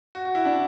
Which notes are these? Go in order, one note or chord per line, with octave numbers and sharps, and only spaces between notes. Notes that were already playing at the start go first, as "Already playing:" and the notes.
F#4
F#4
E4
D4